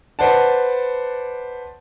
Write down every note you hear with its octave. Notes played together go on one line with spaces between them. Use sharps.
B4 C5 D5 F#5 A5